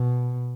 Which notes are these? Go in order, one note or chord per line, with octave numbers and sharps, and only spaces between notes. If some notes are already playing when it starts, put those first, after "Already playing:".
Already playing: B2